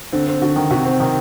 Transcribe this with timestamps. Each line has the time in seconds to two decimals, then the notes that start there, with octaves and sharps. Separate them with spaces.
0.12 D3 C4
0.27 C4
0.41 D3 F#4
0.56 D#3
0.70 C3 F#4
0.85 C4
1.00 C3 D#3